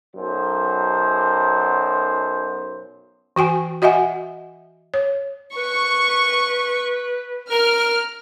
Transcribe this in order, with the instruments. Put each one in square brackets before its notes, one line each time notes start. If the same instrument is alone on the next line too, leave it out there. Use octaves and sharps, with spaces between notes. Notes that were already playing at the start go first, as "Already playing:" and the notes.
[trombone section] B1 F#2 C5
[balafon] E3 F#4 G5 G#5
F#4 D#5 E5 F#5 G#5
C#5
[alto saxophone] B4 [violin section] C#6
[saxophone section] A#4 [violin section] F6